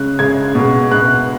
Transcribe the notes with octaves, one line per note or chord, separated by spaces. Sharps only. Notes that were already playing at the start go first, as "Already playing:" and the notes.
Already playing: C#3 G#3 F#6
C#3 G#3 G#6
B2 G#3
B2 G#3 F#6